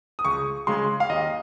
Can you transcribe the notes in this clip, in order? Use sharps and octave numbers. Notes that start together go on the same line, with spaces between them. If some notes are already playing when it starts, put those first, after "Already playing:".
D#6
C#2 C#6
C#3 G#3 C6
F5
D#2 D#5